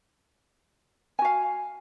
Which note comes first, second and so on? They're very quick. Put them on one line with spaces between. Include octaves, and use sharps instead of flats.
G#5 F#4 F5